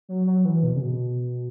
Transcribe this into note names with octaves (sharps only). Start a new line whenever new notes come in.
F#3
F#3
E3
B2
C#3
B2